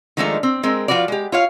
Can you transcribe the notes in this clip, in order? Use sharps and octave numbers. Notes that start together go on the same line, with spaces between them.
D#3 F3 G#3 A3 D4 D#4
C4
G#3 C4 A#4
F3 F4 F#4 B4 D5
G#3 G4
F4 C#5 F5